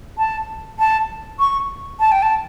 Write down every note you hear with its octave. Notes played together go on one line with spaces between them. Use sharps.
A5
A5
C#6
A5
G5
A5